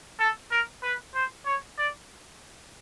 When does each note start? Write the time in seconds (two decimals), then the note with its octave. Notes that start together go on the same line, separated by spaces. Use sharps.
0.19 A4
0.51 A#4
0.83 B4
1.14 C5
1.46 C#5
1.78 D5